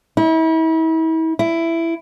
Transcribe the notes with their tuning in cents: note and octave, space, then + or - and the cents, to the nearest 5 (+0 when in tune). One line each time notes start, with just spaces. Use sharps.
E4 -40
E4 +10